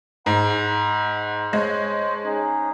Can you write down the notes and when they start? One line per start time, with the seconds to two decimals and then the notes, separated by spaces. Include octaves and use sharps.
0.26 G#2 F#5 B5
1.53 G#3 C5 C#5 A5
2.25 C#4 D#4 G#4